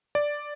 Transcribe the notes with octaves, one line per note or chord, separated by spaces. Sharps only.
D5